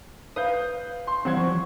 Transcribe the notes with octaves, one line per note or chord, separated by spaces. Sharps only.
B4 F5 D#6 G6
C6
E3 G3 C4 C5 F#5 G#6
F3 C#6